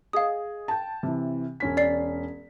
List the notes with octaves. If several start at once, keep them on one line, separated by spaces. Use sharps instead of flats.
G#4 D#5 F5 D#6
G5 A5
C3 E3
E1 C#4 B6
D5 C7